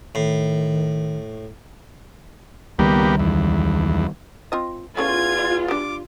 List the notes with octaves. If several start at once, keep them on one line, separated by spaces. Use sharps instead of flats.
A2 D#3
C#2 D#3 G3 A#3 B3 G4
E2
C4 F4 D#5
E2 A3 C#4 F4 G#6
D5
G3 D4 D6